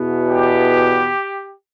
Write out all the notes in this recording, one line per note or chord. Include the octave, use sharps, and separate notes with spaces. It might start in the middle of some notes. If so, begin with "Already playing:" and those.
Already playing: E2 B2 B3
G4